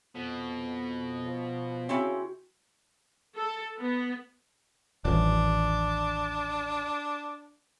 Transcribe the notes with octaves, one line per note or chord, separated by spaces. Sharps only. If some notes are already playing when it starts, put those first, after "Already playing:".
F2 B2
F3
C#3 C4 C#4 E4 F#4
A4
B3
D#1 A1 D4